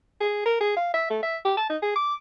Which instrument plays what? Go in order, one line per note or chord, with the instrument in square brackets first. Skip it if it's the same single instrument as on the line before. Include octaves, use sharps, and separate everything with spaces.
[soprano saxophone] G#4
A#4
G#4
F5
E5
A3
E5
G4
A5
D#4
G#4
D6